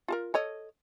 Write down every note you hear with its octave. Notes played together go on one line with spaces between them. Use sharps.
F4 A4 A#4
A4 C#5 D#5